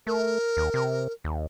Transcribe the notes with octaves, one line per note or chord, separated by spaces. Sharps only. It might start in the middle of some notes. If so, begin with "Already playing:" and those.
A3 A#4
D#2
C3
D#2